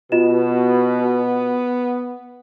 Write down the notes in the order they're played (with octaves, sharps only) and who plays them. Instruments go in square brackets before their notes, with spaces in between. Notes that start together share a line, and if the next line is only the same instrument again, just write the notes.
[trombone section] B2 [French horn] B3 [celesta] F4 D#5 E7